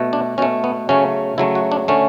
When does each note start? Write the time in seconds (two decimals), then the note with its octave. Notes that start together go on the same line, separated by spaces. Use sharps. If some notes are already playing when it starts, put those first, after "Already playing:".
Already playing: B2 A3
0.13 D4
0.38 B2 A3 C#4
0.64 B3
0.89 C#3 F#3 A3 C#4
1.38 C#3 F#3 A3 E4
1.55 F#4
1.72 D4
1.88 D3 A3 C#4